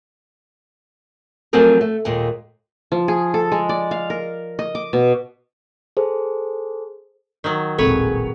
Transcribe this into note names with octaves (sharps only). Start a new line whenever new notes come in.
F3 F#3 A3 C4 G#4 A#4
A3
D#2 A#2 G#3
F3
G#4
A4
G#3
D5
F5
A#4
D#5
D6
B2
G#4 A4 C5
D#3 F#3
D#1 A1 G#3 C4 G#4 A4 B4 C#5